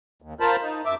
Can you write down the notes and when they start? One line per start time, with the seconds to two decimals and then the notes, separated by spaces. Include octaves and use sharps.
0.22 D#2
0.40 F4 A#4 C5 A5 B5
0.63 D#4
0.86 F#2 E5 D6